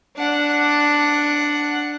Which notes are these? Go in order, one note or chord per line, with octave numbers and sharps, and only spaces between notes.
D4 F#5